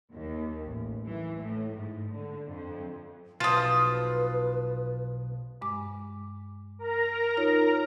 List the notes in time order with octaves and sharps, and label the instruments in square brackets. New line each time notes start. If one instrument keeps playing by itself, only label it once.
[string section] D#2
A1
E3
A2
G#2
D3
F2
[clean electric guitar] B1 [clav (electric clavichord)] F3 F4 [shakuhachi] B4 [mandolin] A5 D#6
[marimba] G2 G#3 D6
[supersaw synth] A#4 A#5
[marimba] D#4 F4 C#5